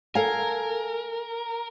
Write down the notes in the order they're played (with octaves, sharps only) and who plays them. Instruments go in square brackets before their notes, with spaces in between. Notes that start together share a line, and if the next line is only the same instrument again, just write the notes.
[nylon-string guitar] A4 F5 G#5 [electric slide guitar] A#4